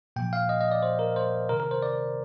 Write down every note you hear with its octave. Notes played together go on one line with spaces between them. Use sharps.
A#2 F3 G5
F5
D#5
D#5
D5
C5
A#4
C5
C3 D#3 A#4
A#4
C5
D5